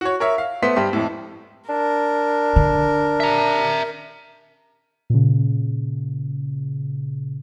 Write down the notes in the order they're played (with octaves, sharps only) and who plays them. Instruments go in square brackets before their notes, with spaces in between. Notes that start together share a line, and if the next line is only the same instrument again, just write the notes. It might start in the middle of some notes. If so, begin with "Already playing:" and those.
[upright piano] F#4 C#5
A#4 C#5 E5
F5
A3 B3 C5 C6 B6
G2 G4 C6
F2 A2
[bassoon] D4 [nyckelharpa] A#4
[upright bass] D3
[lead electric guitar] E5 A#5
[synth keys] A#2 C#3